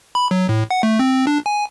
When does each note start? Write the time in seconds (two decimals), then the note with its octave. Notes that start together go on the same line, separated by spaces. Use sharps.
0.15 B5
0.31 F#3
0.49 A2
0.71 F#5
0.83 A3
0.99 C4
1.27 D4
1.46 G#5